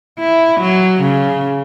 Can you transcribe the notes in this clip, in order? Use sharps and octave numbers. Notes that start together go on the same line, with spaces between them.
E4
F#3
C#3